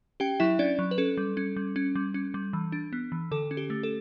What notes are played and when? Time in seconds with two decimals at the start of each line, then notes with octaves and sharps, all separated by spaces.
0.20 C#4 G4 G5
0.40 F#3 E4 E5
0.59 C#4 D4 D5
0.79 F#3
0.91 B4
0.98 C#4 A4
1.17 G3
1.37 C#4
1.56 G3
1.76 C#4
1.95 G3
2.14 C#4
2.34 G3
2.53 E3
2.72 D4
2.93 B3
3.12 E3
3.31 D3 A4
3.51 C#4
3.57 G4
3.70 A3
3.83 A4